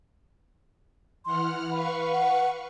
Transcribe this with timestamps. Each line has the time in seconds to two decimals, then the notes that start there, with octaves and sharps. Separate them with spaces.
1.25 E3 F#5 C6 F6
1.71 B4 F5 B5 C#6
2.13 F#5